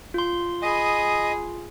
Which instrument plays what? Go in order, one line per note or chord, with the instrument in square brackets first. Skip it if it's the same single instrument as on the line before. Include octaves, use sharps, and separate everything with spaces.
[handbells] F4 C6
[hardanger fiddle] G#4 B5 [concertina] D#5